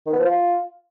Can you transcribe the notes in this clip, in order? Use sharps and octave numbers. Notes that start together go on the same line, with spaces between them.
D#3
B3
F3
F4